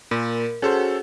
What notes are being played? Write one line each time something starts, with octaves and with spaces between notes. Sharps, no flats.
A#2 A#4
C#4 F#4 G#4 A4 C5 F#5